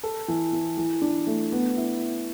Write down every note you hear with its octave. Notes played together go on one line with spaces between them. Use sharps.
A4
E3
E3
E3
D4
A3
B3
E4